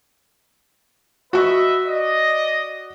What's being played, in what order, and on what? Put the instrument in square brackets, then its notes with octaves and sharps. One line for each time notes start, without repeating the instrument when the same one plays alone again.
[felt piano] F#4 C#6 [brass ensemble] B4 D#5 E5
[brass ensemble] D5 D#5